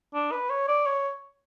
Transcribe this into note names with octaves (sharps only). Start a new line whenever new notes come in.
D4
B4
C#5
D5
C#5